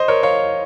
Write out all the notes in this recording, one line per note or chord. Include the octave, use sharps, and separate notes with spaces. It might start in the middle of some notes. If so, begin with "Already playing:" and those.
Already playing: C5 D#5
A#4 C#5
C#5 F5